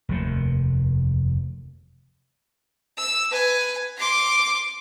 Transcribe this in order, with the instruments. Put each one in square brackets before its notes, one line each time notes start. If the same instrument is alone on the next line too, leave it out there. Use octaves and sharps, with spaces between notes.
[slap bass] F1 D#2 C3
[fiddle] E6
B4 G#5
C6 D6